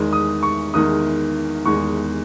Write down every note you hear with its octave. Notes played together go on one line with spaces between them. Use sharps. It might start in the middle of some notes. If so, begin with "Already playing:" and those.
Already playing: E2 D#3 G#3
D#6
C#6
E2 D#3 G#3 D#6
E2 D#3 G#3 C#6